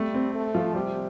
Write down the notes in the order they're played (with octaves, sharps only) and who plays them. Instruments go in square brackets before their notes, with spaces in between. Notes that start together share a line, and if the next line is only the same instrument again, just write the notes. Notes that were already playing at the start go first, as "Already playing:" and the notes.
Already playing: [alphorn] G3 [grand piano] A3
[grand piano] C4
[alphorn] A3
[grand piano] F3 F4
[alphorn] C3 [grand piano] G3 G4